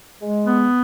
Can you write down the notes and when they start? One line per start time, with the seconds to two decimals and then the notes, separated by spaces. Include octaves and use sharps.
0.22 G#3
0.46 B3